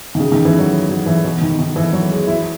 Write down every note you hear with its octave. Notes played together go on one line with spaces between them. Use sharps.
D#3
C#3
D#3
E3
F#3
F#3
E3
B2
D#3
D#3
E3
F#3
G#3
E4